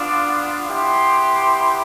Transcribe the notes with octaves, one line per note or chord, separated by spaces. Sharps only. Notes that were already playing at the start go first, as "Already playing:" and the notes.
Already playing: B3 D4 F4 D6
B3 E4 G4 C6